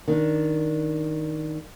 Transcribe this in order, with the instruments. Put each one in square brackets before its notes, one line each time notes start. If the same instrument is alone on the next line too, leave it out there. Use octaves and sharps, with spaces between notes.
[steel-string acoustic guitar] D#3 D4